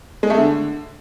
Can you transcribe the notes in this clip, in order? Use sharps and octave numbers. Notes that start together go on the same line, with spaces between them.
G#3
A3
D3